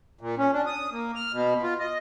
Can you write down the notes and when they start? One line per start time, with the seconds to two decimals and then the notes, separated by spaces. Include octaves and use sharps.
0.21 A#2
0.38 C#4
0.53 D4
0.66 D#6
0.92 A#3
1.16 F6
1.33 B2
1.63 F4
1.80 D#5